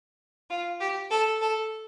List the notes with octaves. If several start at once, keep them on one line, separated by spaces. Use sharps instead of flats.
F4
G4
A4
A4